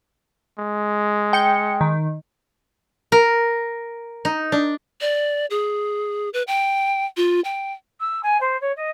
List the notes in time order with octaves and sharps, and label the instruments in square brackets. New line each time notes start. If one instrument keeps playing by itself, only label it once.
[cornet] G#3
[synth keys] G5 C#7
D#3
[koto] A#4
D#4
D4
[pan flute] D5
G#4
B4
G5
F4
G5
[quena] E6
G#5
C5
C#5
D#5